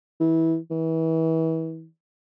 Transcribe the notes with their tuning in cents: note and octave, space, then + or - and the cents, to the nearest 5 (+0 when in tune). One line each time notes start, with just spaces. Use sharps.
E3 -20
E3 -30